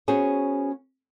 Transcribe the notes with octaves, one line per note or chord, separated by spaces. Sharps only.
B3 C#4 F#4 G#4 C5 C#5